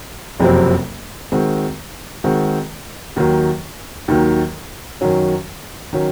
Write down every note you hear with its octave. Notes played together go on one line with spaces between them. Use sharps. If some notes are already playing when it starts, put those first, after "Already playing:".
F#1 F2 C3 F#3 C4
D#3 G#3 C4 F#4
D#3 G#3 C4 F#4
D#2 D#3 F#3
D#2 D#3 F#3
F#2 D#3 F#3 C#4
D#3 F#3 C#4